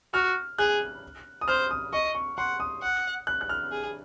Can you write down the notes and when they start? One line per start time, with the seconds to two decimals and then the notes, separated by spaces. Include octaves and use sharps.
0.14 F#4 F6
0.58 G#4 F#6
1.41 D#6
1.48 C5 F6
1.71 D#6
1.93 D#5 C#6
2.15 C#6
2.37 F#5 C6
2.60 D#6
2.82 F#5
3.27 F#6
3.41 F#6
3.49 F6
3.72 G#4